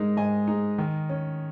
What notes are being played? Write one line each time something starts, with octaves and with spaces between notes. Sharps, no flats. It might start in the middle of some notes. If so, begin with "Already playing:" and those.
Already playing: G#2 G#3 D#4 A#4
G#2 D#5 G#5
G#3 D#4
D#3
C#4